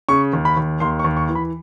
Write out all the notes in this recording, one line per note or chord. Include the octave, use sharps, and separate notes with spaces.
C#3 C#6
D#2
B5
D#2
D#2 C6
C#6
D#2
C#6
E3
B5